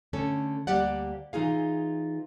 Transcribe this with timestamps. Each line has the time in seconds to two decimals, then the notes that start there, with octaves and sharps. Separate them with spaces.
0.13 D3 A3 C#4 A4
0.67 D2 G3 A#3 G4 D5 F#5
1.33 E3 D#4 F4 G#4 F5